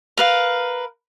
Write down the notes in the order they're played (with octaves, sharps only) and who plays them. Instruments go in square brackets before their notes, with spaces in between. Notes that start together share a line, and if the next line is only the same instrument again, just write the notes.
[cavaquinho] A#4 B4 F5